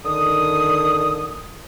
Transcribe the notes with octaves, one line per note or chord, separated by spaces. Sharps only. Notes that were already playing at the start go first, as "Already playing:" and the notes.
D3 D#3 D#6